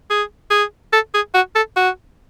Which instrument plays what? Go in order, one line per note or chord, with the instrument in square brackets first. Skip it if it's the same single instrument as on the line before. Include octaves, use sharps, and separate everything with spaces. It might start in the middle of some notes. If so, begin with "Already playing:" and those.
[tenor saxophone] G#4
G#4
A4
G#4
F#4
A4
F#4